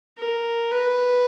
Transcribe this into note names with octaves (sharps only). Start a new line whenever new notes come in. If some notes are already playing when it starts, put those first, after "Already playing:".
A#4
B4